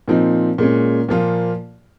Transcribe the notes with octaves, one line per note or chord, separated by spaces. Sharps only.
A#2 F3 C4 D#4
A#2 G#3 C#4
A#2 F3 A#3 F4